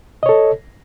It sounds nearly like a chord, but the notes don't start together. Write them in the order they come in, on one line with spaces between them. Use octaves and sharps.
D#5 C#5 A4